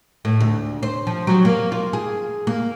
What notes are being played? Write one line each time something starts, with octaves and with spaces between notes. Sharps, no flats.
A2
D2
C5
F3
F#3
A#3
F4
G#4
A#3